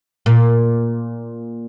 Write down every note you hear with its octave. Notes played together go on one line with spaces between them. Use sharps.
A#2